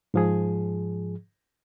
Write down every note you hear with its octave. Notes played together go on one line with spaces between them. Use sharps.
G#2 F3 G#4